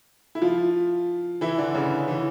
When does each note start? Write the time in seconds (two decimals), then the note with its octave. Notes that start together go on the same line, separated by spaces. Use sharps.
0.35 E4
0.42 F3 F4
1.41 E3 E4
1.58 D3 D4
1.75 C#3 C#4
2.08 E3